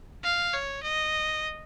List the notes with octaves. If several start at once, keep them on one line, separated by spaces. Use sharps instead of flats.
F5
C#5
D#5